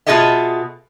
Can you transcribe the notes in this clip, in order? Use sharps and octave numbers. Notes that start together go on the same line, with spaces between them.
B2 F4 G#4 A4 D#5 E5